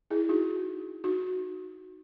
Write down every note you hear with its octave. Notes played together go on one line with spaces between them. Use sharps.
E4 G#4
D#4 F#4
D#4 F#4